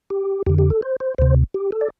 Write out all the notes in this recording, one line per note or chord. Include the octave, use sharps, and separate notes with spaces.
G4
F2 D3 G4
G4
A4
C5
C5
D2 C3 C5
G4
A4
D5